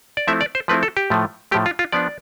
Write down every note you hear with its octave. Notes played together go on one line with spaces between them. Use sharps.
D5
F3 A3 C4 E4 E5
D5
C5
F3 A3 C4 E4 B4
A4
G4
A2 F3 A3
A2 F3 A3 G4
F4
F4
F3 B3 D4 D5